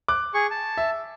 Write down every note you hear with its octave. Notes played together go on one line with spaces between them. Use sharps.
D6 F#6
G#4 C#6
A5
E5